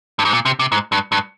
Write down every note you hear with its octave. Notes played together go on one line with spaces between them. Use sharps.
G2
G#2
A#2
C3
C3
G#2
G2
G2